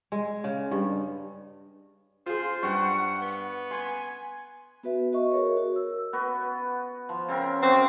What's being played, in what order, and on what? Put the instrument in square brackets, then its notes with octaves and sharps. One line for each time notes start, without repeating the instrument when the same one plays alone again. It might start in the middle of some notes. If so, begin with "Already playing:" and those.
[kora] G#3
C#3
G2
[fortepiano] F4 G#4 [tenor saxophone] C5 [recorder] C6
[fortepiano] G2 [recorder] F#5 [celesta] C#6
[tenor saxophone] B3
[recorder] G#5 [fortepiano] C6
[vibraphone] B3 F#4 B4 E5
F#4 D#5 E5 C#6
F#4 G#4 A#4 C#5
F#4
A#4 E6
[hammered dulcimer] B3 F#4
F3
C#3 C4 A#4
[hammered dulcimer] F#3 F#4 A#4 [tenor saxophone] C4